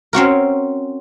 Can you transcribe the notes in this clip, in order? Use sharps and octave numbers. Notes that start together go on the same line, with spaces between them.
C4 C#4 F#4 A#4